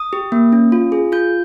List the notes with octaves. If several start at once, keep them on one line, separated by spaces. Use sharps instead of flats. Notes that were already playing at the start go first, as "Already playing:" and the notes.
Already playing: D#6
G4
A#3
C#4
F4
G#4
F4 G6